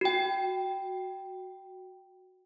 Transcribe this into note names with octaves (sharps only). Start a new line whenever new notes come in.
F#4 G5